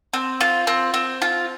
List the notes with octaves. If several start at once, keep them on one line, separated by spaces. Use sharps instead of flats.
C4
F4
C4
C4
F4